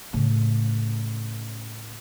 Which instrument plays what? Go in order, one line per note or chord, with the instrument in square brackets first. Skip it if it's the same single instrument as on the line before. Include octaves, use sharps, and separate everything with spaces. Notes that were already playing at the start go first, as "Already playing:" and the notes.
[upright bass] A2 C#3